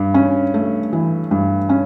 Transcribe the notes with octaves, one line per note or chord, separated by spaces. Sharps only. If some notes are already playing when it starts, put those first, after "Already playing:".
Already playing: G2
C#4
A3
E3
G2
C#4